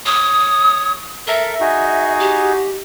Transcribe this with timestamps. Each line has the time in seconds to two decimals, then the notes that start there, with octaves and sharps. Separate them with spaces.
0.06 C#5 D#6
1.28 A4 A#4 E5
1.61 D#4 F#4 G#4
2.19 G4